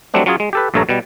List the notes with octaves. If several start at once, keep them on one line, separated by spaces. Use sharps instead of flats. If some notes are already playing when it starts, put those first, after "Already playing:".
F#3 G3 A3 C4 D4
F#3 C#4 F4 G#4
G#3
G4 A4 B4
A#1 G2 A3 A4 C#5 A#5
B2 G3